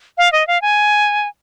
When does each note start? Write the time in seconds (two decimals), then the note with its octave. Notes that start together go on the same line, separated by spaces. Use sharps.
0.18 F5
0.32 D#5
0.47 F5
0.62 G#5